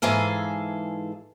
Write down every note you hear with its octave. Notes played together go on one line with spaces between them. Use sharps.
G#2 E3 G#4 A4 F5